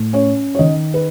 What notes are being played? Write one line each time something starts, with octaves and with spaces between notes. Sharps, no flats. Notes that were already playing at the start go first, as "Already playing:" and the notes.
Already playing: A2
C#4 C#5
C#5
D#3 D#5
B4